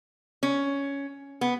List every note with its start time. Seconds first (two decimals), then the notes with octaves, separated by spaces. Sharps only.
0.43 C#4
1.41 B3